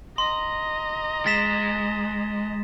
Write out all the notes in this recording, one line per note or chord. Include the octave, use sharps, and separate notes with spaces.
D#5 A#5 C6
G#3 A6 B6 E7